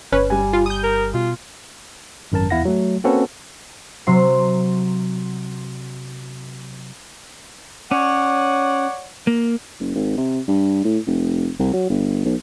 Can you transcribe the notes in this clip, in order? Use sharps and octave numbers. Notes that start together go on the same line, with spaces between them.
G1 C#4 B4
G3 G#5
F4
D#6 G6
A#4
B2 F4
G#1 F#2 A#4 A5
E2 E4 F5 F#5 A#6
F#3 A3
A#3 C4 C#4 F#4 A4 B4
C3 F#3 C6
C#4 C#5 D5 F#5
A#3
F#1
G#1
C3
G2
A2
F1
C2
F#3
G1
B1